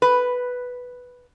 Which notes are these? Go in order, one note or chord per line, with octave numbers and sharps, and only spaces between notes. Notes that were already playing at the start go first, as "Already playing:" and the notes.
B4